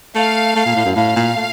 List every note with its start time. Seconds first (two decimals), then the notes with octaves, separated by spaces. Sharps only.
0.15 A3 F5
0.56 A3
0.65 A#2
0.75 A2
0.85 F#2
0.95 A2 F5
1.16 A#2
1.36 A3